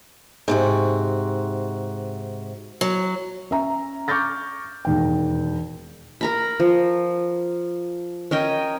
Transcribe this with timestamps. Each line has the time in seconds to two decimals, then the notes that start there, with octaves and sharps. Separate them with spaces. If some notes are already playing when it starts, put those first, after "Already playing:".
0.48 G#2 C3 F#4
2.81 F#3
3.51 C#4 E5 A#5
4.08 C#6 D6 F6 G6 A6 A#6
4.85 E1 D#2 G5
6.21 A#4 A#5 B5
6.60 F3
8.31 C#4 A#4 D#5 G5